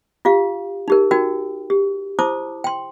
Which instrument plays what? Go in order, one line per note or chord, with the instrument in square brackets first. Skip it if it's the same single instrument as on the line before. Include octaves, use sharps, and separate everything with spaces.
[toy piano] F4 G4 F5
D#4 G4 A#4
D#4 F#4 A#4 G5
G4
E4 C5 A5 D6 D#6
G5 C6